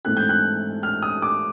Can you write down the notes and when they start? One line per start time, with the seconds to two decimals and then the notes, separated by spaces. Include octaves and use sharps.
0.05 G#2 E3 A3 C4 F#6
0.17 G6
0.29 F#6
0.83 F6
1.02 D#6
1.22 D6